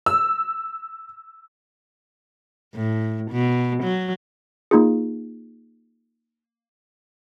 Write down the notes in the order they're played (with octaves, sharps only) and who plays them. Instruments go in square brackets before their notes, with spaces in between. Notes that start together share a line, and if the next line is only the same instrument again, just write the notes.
[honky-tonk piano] E6
[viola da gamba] A2
B2
F#3
[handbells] A#3 D#4 F4 G#4